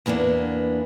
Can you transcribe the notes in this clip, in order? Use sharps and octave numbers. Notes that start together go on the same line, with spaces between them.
E2 E3 A#3 B3 D4